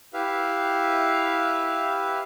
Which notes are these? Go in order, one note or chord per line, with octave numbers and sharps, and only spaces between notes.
E4 G4 B4 E5 F5